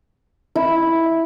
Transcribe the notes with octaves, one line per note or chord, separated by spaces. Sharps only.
E4